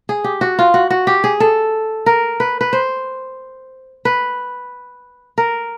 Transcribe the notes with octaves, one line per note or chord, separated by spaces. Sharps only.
G#4
G4
F#4
F4
F#4
F#4
G4
G#4
A4
A#4
B4
B4
C5
B4
A#4